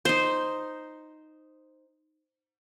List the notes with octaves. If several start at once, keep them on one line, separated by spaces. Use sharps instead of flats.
D#4 C5